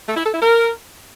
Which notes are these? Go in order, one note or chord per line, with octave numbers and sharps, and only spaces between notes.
A3
E4
A4
E4
A#4